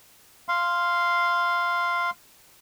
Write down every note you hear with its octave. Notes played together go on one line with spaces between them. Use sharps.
F5 C6